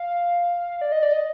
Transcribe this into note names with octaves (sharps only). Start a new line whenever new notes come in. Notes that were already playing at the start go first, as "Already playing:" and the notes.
Already playing: F5
D5
D#5
D5
D#5